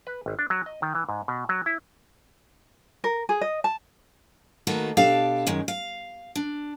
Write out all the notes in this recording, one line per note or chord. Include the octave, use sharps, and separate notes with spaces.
B4
G#1
D4
F#3
D#5
D#3
E3
G#2
B2
F#3
E4
A#4
G#4
D#5
A5
D#3 A3 A#3 F#4 B4
B2 D4 G4 A4 F5
F#2 D#3 G#3
F5
D4